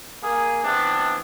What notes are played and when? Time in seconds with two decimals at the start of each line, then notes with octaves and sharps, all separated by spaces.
0.22 A#3 G#4
0.64 C3 E3 B3 D4